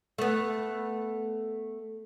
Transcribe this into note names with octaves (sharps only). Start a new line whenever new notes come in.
A3 B3